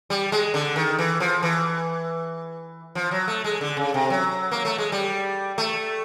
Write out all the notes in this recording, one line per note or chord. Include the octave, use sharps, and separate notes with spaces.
G3
G#3
D3
D#3
E3
F3
E3
F3
F#3
A3
G#3
D3
C#3
C3
F#3
A#3
A3
G#3
G3
A3